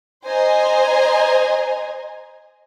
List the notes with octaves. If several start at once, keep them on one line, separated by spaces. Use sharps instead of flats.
C5 D#5 G#5 A#5